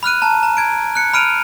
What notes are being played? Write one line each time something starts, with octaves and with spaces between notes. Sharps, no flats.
B5 F6 F#6 D#7
A5 A#5
A#5
G#6 D7
F#6 C#7
B5 F6 D7 D#7 F7